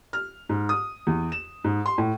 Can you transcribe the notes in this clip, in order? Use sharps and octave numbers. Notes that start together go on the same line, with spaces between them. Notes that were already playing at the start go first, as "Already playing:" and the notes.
F6
G#2
D#6
E2
E7
G#2
C6
A2